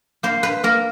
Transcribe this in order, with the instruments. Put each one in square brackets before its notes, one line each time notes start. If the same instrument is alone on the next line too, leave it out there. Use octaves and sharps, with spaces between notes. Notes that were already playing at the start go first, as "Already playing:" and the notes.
[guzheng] A#3 C5
B4
A#3 A#4